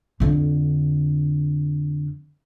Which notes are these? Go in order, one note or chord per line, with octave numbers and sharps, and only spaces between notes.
F2 D3